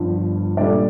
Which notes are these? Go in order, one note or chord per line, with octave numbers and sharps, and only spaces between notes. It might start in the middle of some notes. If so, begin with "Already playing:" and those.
Already playing: G1 G2 F3
A#2 G3 D4 A4 D5